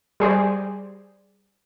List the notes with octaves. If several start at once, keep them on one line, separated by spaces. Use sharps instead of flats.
G3 G#4 C5 D5